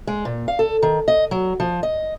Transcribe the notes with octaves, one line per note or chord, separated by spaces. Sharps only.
G#3
A#2
F5
A4
D#3
D#5
F#3
F3
D#5